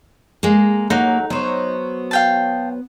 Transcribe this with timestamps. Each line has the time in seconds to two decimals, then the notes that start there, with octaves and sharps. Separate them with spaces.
0.43 G#3 A#3
0.90 A2 F#3 A#3 D#4 F#5
1.30 F#3 B3 C5 C#5
2.11 F5 G5 A5